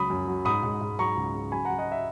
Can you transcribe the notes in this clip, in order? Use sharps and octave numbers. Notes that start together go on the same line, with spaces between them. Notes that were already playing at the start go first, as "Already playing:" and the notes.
Already playing: C#2 F#3 B5 D#6
F#2
F#3
G#2 B5 D#6
G#2
G#2
F#3 A#5 C#6
C#2
C#3
F#3 G#5 B5
F#5 A#5
F#3
D#5 F#5
E5